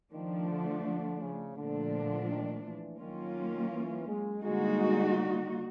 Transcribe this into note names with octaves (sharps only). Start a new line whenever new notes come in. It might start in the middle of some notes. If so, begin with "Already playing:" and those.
D#3 F3 A3 D4
D3
D3
C#3
A#2 D3 F3 A3 D4
D#3
E3
D#3 F#3 A#3 C#4 F4
E3
G#3
D3 G3 G#3 A#3 D#4 F#4